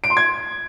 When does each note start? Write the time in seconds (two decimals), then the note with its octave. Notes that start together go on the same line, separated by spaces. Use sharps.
0.04 D7
0.10 C6
0.17 G#6